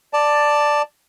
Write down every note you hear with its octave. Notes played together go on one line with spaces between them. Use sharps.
D5 A5